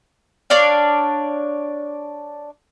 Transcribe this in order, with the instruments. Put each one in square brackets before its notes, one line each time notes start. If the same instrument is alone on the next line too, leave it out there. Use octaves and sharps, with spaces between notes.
[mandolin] D4 C#5 D5 F5